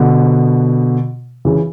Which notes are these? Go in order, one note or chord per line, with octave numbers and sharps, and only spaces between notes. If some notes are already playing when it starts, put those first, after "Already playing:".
Already playing: B2 D3
C#3 E3